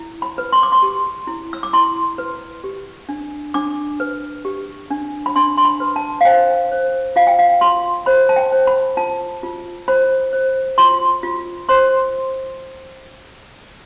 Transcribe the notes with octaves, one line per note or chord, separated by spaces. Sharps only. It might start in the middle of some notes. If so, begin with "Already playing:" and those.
Already playing: E4
B5
B4
C6
D6
C6
G4
E4
E6
D6
E4 C6
B4
G4
D4
D4 D6
B4
G4
D4
B5
D4 C6
C6
B5
B4
A5
F5
C5 G5
C5
F4 F5
G5
F5
F4 C6
C5 B5
A5
G5
C5
B5
F4 A5
F4
C5 B5
C5
F4 C6
F4
C5 C6